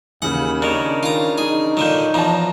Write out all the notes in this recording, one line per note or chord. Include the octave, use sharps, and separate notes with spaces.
D#2 C#3 E3 F#5
D#3 D4 A#4 C#5
D#3 F4 A#5
D#4 G#4
A#2 D3 D#3 F#3 G6
E2 F3 A5 A#5